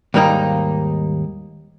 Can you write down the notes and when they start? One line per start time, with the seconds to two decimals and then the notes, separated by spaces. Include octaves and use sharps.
0.14 D#2 G#2 G3 A#3 D#4